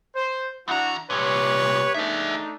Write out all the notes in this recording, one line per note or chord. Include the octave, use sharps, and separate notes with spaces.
C5
E2 D4 E4 F#4 A#5
C2 A#2 G4 B4 C#5
A3 D4 D#4 G#4 E5